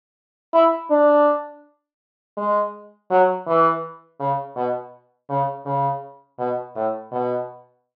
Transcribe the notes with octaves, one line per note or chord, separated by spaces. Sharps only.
E4
D4
G#3
F#3
E3
C#3
B2
C#3
C#3
B2
A2
B2